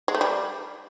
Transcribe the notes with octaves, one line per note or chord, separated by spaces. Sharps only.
G#3
A3
G3